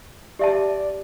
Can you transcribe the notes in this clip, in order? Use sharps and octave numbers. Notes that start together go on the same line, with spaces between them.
G4 D5 E5 A5